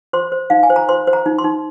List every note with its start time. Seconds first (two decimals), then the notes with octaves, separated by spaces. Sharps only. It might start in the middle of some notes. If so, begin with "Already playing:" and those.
0.13 C5 C6
0.32 C5
0.50 D#4 F5
0.63 G#5
0.70 C5
0.76 A#5
0.89 C5 C6
1.07 C5
1.13 A#5
1.26 D#4
1.39 C6
1.44 D#4